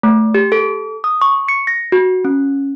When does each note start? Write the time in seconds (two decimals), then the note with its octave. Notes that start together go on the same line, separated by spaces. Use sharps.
0.03 A3
0.34 G4
0.52 A4
1.04 D#6
1.21 C#6
1.48 C#7
1.67 A#6
1.92 F#4
2.25 C#4